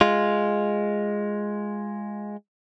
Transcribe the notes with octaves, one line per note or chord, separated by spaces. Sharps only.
G#3 F4